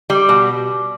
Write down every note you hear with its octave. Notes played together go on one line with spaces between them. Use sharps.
G3
B2